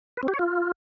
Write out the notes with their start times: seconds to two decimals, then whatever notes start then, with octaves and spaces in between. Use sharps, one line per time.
0.17 B4
0.23 C4
0.28 G4
0.34 C#5
0.39 F4